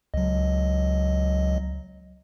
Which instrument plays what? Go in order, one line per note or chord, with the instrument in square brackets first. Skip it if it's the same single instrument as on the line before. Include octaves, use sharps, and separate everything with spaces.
[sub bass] C#2 [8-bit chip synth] F#3 D#5